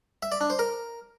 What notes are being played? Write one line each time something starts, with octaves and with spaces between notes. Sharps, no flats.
E5
D5
D4
C5
A#4